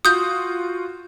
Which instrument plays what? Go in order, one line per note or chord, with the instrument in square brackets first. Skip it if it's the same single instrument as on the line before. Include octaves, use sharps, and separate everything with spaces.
[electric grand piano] F4 F#4 [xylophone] D#6 G6